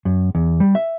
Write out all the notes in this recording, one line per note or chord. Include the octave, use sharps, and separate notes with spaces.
F#2
E2
G3
E5